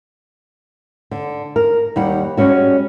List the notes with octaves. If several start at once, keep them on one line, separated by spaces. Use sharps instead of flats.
D3
A#4
D#2 G3 F#5
G3 G#3 C#4 F#4